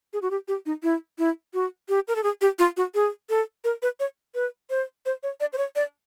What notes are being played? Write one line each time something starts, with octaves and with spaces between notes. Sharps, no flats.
G#4
F#4
G4
G4
D#4
E4
E4
F#4
G4
A#4
A4
G#4
G4
F4
F#4
G#4
A4
A#4
B4
C#5
B4
C5
C5
C#5
D5
C5
C#5
D5